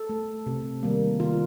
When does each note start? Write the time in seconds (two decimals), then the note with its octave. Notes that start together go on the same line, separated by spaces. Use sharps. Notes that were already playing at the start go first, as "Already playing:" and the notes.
Already playing: A4
0.09 A3
0.46 C3
0.83 D#3 G3 A#3
1.20 D#3 F4